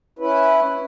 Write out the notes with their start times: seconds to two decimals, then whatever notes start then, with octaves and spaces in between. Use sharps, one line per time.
0.19 C#4 E4 B4